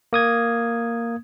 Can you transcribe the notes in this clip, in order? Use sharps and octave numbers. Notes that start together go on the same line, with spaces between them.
A#3 D#6 G#6